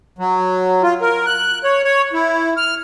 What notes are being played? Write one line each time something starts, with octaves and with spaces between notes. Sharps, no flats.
F#3
F4
A#4
F#6
C#5
C#5
E4
F6